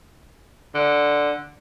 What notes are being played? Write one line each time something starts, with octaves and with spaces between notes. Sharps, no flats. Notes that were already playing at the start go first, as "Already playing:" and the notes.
D3